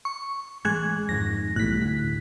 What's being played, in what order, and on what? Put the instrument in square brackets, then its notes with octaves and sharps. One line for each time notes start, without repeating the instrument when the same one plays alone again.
[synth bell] C#6
[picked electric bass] A1 [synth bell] G#3 F#6 G#6
[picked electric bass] F2 G#2 D#3 [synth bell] A#6
[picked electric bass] B1 E2 G3 [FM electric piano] A2 B6 [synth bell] F#6
[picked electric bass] D2